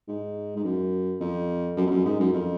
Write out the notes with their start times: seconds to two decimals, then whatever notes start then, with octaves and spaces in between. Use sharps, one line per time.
0.08 G#2
0.56 G#2
0.64 F#2
1.20 F2
1.77 F#2
1.86 F2
1.91 F#2
2.05 G#2
2.20 F#2
2.33 F2